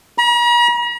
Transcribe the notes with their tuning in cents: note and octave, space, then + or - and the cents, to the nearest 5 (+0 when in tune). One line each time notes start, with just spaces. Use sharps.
A#5 +45